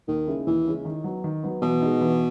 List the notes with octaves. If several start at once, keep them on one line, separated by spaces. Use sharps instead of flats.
D#2 D#3
C#3 G#3 C#4 E4
D#2 E3
C#3 G#3 C#4 E4
D#3
F#3 B3
D#3
F#3 B3
B2 E3
G#3 D#4
E3